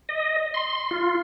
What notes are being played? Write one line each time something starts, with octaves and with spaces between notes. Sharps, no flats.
D#5
C6
F4